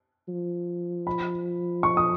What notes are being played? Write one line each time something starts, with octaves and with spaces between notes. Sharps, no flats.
F3
B5
C#6
D#6